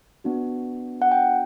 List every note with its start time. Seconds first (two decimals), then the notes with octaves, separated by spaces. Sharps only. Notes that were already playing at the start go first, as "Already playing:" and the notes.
0.24 B3 D4 F#4
1.02 F#5
1.12 G5